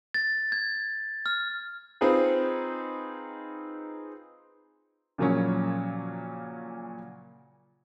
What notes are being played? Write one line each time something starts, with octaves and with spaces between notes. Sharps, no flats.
A6
G#6
F6
C4 D#4 F4 G#4 B4
A#2 C#3 F3 F#3 A#3 C#4